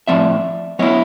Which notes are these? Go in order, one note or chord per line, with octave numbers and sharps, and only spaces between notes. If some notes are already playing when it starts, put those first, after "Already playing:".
A2 F3 G#3 C4 D5 E5
F#3 B3 E4 C#5 D#5